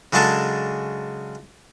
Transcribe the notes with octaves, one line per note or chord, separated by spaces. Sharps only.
C#3 F#3 G#3 D4 A4